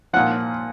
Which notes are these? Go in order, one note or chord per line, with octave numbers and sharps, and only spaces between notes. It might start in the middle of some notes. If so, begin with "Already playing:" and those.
A#2 F3 F#5